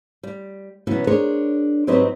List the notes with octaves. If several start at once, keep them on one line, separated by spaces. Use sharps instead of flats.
G3
B2 E3 F#3 B3 C#4
D4 G#4 A#4 C5 C#5
G#2 F#3 C4 G4 B4 D#5